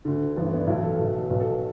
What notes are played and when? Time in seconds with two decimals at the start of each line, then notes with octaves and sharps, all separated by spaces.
0.05 D2 D3
0.36 A1 G2 E3 A4
0.47 E4
0.53 B3
0.56 D4
0.67 B1 A2 E3 E4
0.84 A4
0.99 B1 B2
1.30 B1 B2 B4
1.40 A4
1.51 A4